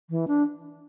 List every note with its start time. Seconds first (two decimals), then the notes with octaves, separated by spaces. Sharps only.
0.10 E3
0.28 D4